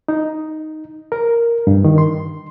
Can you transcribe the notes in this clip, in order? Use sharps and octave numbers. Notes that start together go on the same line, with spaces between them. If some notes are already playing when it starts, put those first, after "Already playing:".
D#4
A#4
G2
D#3
C6